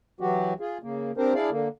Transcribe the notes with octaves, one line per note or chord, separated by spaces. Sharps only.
E3 F#3 F#4 G4
F4 G#4
C#3 A#3
C4 D4 G4 A#4 C5
D4 E4 G#4 D5 F5
D3 A#3